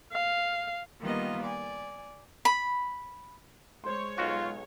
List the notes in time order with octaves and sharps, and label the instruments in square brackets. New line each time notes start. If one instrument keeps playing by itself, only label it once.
[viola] F5
[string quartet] D#3 G3 A#3 B3 F4 D#5
D5 G#5
[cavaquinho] B5
[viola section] G#3 C#5 [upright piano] C5 C6
[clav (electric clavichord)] B1 F#4 [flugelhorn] F4